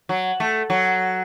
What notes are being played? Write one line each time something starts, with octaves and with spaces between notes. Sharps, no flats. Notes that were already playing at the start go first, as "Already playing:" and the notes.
F#3
A3
F#3